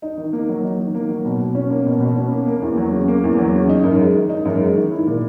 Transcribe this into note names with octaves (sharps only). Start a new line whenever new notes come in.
D#4
D#3
A#3
F#3
D#4
D#3
A#3
F#3
B2
B2
C#4
A#3
B2
B2
C#4
A#3
A#3
E2
F#3
C#3
A#3
E2
F#3
C#3
D#4
F#2
G#3
D#3
D#4
F#2
G#3
D#3
E4
A#2